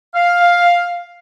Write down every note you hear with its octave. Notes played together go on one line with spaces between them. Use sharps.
F5